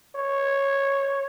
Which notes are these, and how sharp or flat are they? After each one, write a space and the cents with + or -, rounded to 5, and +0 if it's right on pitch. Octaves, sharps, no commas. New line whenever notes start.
C#5 -10